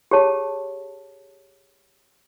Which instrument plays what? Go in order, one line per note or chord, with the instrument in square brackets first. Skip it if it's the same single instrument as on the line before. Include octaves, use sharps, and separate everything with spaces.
[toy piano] G4 G#4 C#5 A5